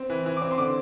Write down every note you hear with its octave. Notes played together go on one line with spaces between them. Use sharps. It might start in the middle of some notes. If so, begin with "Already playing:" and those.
Already playing: C4
E3
E3
D6
C4
C6
D3 D6